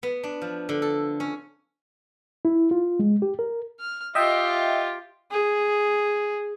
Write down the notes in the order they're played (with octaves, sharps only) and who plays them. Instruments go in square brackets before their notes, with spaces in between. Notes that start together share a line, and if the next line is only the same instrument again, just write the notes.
[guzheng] B3
D4
F3
D3
A4
C#4
[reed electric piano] E4
F4
G#3
G4
A#4
[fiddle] F6
[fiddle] F4 G4 [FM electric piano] D#5 E5 G5
[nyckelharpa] G#4